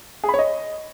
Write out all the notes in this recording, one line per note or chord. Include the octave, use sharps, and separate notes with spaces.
G#4
B5
C#5
D#5